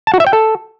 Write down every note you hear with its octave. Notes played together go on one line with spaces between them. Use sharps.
A5
F#4
E5
G5
A4